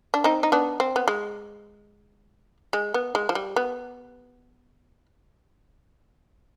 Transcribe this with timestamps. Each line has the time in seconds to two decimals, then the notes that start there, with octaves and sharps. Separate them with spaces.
0.14 D4
0.24 C4 D#4
0.43 D#4
0.52 B3 D4
0.80 C4
0.96 B3
1.08 G#3
2.73 G#3
2.94 B3
3.15 G#3
3.29 F3
3.35 G3
3.56 B3